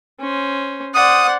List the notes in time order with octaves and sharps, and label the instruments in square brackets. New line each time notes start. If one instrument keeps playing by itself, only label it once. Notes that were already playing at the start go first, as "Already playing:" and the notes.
[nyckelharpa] C#4 C5
[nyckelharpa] C5 D5 [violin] F#5 [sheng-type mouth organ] D#6